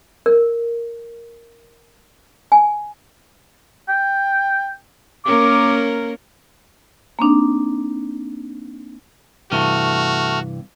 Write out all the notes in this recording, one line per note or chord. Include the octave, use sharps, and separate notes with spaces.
A#4
G#5
G5
A#3 C#4 A#4 D6
A#3 C4 D4 D#4
G2 C3 E3 A3 F#4 F6